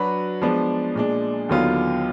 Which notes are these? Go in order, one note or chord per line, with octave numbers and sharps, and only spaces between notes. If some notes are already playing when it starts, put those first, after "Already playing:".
Already playing: F#3 D4 F#4 B4
F3 G#3 B3 D4
A#2 G#3 D4
D#2 D3 F#3 B3 F4